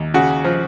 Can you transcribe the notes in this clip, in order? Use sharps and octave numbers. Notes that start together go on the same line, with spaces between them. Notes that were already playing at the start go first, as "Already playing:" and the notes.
Already playing: D#2
C#3 F#4
F3